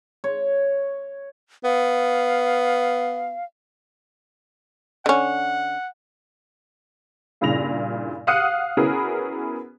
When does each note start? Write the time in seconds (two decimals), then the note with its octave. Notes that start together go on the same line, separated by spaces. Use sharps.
0.24 C#5
1.64 B3 F5
5.06 D3 C#4 F#5
7.41 G2 A#2 C#3 E4 A#6 F7
8.27 F5 F#5 D#6 F#6 C#7 D#7
8.77 B3 C#4 E4 F#4 G#4 A#4